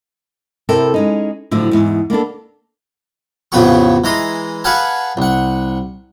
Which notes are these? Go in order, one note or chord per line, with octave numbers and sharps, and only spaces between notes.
C3 E4 A4 A#4 G5
G#3 C#4 D#4
A2 D3 F3 F#3
E2 G#2
A#3 B3 D4 A4
A1 F2 C#3 B3 G#4 C#6
E3 G#3 A#5 C6 D#6
G#4 B4 F5 F#5 G#5 A5
C2 F#5